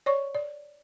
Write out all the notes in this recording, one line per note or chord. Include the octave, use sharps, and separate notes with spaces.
C#5 D5 C#6
D5